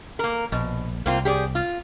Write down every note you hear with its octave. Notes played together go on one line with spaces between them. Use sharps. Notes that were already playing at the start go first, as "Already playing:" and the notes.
A#3 A#4
A#1 B2
C2 A#3 C4 F4
G4 G#4 D5
F4